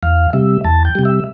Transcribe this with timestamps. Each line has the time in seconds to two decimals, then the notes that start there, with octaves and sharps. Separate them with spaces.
0.03 E2 F5
0.33 C3 G3 E5
0.64 E2 A5
0.85 G5
0.95 C3 G3
1.05 E5